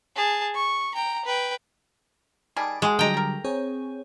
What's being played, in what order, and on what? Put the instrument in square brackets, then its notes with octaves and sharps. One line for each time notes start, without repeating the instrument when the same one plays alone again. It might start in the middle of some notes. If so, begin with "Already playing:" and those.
[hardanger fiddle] G#4 A5
C#6
G5 A#5
B4 G5
[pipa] D#3 G3 G#4 [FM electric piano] A5 B5 D6
[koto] G#3 [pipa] F#4 G#4
[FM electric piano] D3 F#3 G3 [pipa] A4 D#5 [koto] G5 A#5
[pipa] A4 A#4
[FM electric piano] C4 G#4 C#5